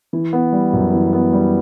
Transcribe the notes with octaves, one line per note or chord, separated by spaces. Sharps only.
E3
B3
G3
F#2
E3
B3
G3